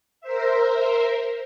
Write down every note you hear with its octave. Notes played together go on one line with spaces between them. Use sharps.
A#4 C5 E5